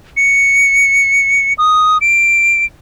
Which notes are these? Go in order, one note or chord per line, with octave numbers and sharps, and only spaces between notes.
C#7
D#6
D7